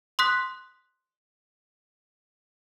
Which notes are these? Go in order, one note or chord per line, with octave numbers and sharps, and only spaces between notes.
C6 D#6 F#6 B6